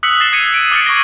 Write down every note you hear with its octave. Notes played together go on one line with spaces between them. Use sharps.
D#6 E6 F#6 B6 C#7 F#7
A6 A#6 C7 E7 G7
D#6 G#6 C#7 D#7
D7
D6 F6 A6 C7 C#7
C#6 D6 G#6 A#6 F#7 G7